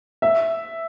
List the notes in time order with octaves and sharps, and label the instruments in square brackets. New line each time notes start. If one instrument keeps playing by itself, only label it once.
[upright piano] E5